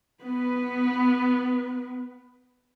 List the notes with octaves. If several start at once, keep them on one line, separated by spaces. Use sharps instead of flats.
B3 B4